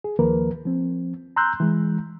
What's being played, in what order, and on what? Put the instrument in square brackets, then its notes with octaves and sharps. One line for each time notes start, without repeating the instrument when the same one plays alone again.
[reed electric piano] G#4
D#2 D#3 F3 A#3 A#4 B4
F3 C4
A#5 C6 E6 F#6 G6
E3 G#3